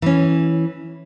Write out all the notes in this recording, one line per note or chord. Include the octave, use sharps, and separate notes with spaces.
E3 C#4